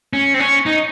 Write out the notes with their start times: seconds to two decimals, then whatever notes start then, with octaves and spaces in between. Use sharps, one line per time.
0.13 C#4
0.34 C4
0.40 C#4
0.66 D#4